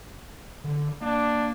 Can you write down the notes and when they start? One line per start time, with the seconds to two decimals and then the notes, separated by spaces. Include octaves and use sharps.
0.64 D3
1.01 A#3 D4